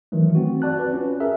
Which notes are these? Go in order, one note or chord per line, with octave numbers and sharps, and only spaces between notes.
D#3 E3 F#3 A3
C4 F#4
F#4 D5 A5 F#6
B4
C#4 F4
G#4 A#4 E5